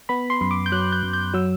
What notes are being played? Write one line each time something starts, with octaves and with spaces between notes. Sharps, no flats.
B3 B5
C6
F#2 C6
D6
G6
F#3 F#6
G6
F#2
G6
F#3 E6